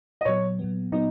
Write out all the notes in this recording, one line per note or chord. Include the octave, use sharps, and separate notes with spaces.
D#5
A#2 F#3 B3 C#5
A#2 F#3 B3
A#2 F#3 B3 D#4